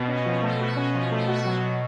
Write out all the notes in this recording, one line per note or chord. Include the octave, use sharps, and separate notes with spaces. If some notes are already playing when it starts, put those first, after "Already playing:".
Already playing: B2
C#4
F3
A3
F#4
C#4
F3
A3
F#4
F#3